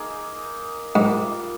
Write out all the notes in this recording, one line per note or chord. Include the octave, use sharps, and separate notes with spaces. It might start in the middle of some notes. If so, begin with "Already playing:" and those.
Already playing: A#3 D#4 G#4
G#2 G3 A#3 F4